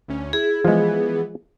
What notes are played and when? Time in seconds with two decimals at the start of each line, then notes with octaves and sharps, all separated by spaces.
0.08 D2 C#4
0.33 E4 G#4
0.65 E3 F3 G#3 B3